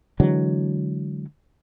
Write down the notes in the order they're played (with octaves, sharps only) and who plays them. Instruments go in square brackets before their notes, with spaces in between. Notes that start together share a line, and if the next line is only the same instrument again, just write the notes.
[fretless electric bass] D3 E3 F#3 G#3